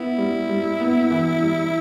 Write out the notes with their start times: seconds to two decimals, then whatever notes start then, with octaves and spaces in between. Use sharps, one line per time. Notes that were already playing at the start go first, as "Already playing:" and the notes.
Already playing: B3 E4
0.18 G3
0.49 G3
0.80 B3
1.10 E3
1.42 G3